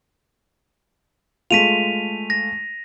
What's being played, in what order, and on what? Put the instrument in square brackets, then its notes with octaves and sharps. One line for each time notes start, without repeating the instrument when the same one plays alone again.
[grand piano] G#3 A3 F4 [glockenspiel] B6 D#7 F7
[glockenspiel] A#6